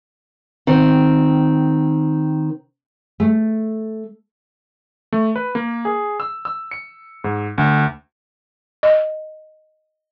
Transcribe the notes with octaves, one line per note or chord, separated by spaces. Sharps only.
D#3 C4
A3
A3
B4
A#3
G#4
E6
E6
C#7
G#2
D2
D#5